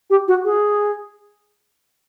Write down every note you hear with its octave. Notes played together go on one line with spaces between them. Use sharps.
G4
F#4
G#4